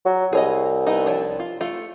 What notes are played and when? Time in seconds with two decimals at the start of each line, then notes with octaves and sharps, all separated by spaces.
0.06 F#3
0.33 C2 G#4 C#5 D#5
0.87 G3 B3 D#4
1.06 F3 D4 C#5
1.39 F4
1.61 A3 F4